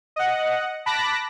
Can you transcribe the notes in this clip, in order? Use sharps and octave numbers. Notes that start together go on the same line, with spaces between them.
D#5 F#5
A5 B5 D6 F#6 A#6